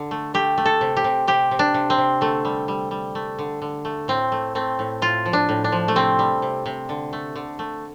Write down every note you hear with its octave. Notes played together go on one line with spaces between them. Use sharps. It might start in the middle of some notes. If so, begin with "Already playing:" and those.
Already playing: D3
A3
A3 G4
A3
A4
C3
G4
C3
C3 G4
C3
D4
C3
C4
C3
D3 A3
G3
G3
G3
A3
D3
D3
A3
A2 C4
A3
A3 C4
A2
A2 F4
F3
D4
A2
D4
F3
A3
C3 C4
G3
C3
C3
D3
A3
D3
A3